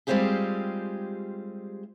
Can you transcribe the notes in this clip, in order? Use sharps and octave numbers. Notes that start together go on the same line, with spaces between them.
G3 G#3 C4 F4 G4 G#4